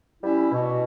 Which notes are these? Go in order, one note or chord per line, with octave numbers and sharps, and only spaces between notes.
G3 C#4 E4
B2